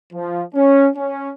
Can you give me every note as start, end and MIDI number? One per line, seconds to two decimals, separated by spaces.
0.13 0.43 53
0.55 0.88 61
0.96 1.30 61